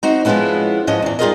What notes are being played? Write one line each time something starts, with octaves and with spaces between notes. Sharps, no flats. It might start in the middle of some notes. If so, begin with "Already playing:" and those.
C4 D#4 F#4
F3 G#3 A#3 B3 C#4 E4
G#2 F3 C#4 D#5
E2 E3
G3 D#4 F4 G#4 A#4 D#5